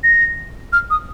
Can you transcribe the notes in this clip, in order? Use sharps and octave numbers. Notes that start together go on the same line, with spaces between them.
A#6
F6
D#6